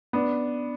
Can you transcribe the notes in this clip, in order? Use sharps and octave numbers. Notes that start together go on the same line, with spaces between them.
B3 D4